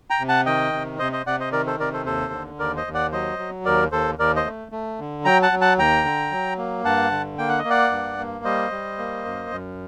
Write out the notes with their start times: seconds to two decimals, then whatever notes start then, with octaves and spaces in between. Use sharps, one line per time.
0.10 G5 A#5
0.20 C3
0.28 F#5 A5
0.46 D#3 D#5 G5
0.73 C3
0.99 C3 C5 D#5
1.13 C5 D#5
1.26 C3 D5 F#5
1.40 C5 D#5
1.52 D#3 A#4 D5
1.67 A4 C5
1.80 C3 A#4 D5
1.93 A4 C5
2.06 D#2 A4 C5
2.33 D3
2.59 D#2 A#4 D5
2.76 C5 D#5
2.86 D#2
2.94 D5 F#5
3.12 F#3 C5 D#5
3.39 F#3
3.65 D#2 A#4 D5
3.92 D#2 A4 C5
4.19 D#2 A#4 D5
4.36 C5 D#5
4.45 A3
4.72 A3
4.99 D3
5.25 F#3 G5 A#5
5.43 F#5 A5
5.52 F#3
5.61 F#5 A5
5.78 D#2 G5 A#5
6.05 D3
6.31 F#3
6.58 A#3
6.84 G2 F#5 A5
7.12 D3
7.38 A#3 G5
7.49 F#5
7.59 D#5
7.64 A#3
7.69 D5 F#5
7.91 G2
8.18 A#3
8.45 G3 C5 D#5
8.71 G3
8.98 A#3
9.25 F#2
9.51 F#2